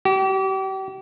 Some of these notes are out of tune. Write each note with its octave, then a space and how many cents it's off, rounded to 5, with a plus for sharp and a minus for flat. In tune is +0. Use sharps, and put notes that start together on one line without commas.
G4 -35